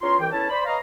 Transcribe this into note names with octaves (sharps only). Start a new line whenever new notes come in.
E2 C#4 F4 A#5 C6
C2 E3 G5
E2 C#4 E4 A4 A5
C5 D5 B5
B4 C#5 D#5 F5 A#5